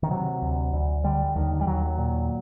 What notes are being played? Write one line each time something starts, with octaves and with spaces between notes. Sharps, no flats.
D#3
C3 F#3
D2
D2
D3 G3
D#2 D#3
G3
D#2 F#3
A#2